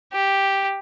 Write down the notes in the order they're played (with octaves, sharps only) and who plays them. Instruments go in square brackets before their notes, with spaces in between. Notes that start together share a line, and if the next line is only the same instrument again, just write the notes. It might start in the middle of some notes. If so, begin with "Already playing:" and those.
[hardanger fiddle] G4